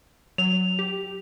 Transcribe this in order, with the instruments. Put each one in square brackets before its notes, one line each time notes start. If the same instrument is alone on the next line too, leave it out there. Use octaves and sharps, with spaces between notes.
[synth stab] F#3 [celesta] F7
[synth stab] G4